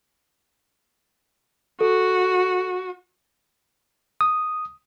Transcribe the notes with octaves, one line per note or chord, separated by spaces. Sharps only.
F#4 A4
D#6